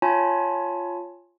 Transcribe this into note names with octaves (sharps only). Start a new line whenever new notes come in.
F4 C#5 G#5 A5 B5